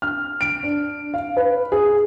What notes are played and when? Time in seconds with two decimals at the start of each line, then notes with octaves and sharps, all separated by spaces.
0.02 F6
0.41 D7
0.63 D4
1.14 F5
1.37 B4
1.72 G#4